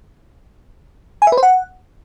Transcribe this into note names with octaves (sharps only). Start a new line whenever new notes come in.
G#5
E5
B4
C5
F#5